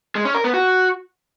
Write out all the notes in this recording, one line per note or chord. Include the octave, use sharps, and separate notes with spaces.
G#3
C#4
A#4
B3
F#4